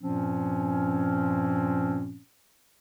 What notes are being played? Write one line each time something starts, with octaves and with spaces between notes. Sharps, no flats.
G2 A#2 F3 C4 C#4